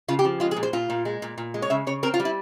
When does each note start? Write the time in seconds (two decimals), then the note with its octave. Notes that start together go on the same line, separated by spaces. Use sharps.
0.08 C#3 F4
0.19 G4
0.25 F3
0.40 G#3 F4
0.51 G#4
0.56 A#2
0.63 C5
0.73 A#2 F4
0.90 A#2
1.05 G#3
1.22 A#2
1.38 A#2
1.54 G#3
1.62 C#5
1.70 C#3 E5
1.87 C#3 C#5
2.03 C4 A#4
2.14 F4
2.20 G3
2.25 E4